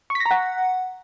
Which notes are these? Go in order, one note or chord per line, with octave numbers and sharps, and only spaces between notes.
C#6
B6
A#6
A#5
F#5